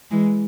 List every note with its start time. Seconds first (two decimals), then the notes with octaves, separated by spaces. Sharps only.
0.11 E3 G#3